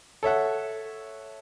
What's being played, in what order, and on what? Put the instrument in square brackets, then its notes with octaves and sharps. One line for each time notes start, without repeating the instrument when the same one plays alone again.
[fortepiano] A4 C#5 E5 F#5